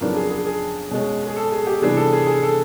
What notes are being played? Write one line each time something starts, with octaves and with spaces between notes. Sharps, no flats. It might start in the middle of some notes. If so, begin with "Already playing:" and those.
F2 C#3 F#3 B3 D4 A#4
G#4
G#4
G#4
B2 G#3 C#4
G#4
A4
G#4
G4
C3 E3 G3 B3 D4 G#4
A4
G#4
G#4
A4